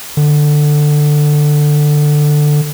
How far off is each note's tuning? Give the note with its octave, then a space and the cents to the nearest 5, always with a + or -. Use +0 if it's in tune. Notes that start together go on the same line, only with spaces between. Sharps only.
D3 +15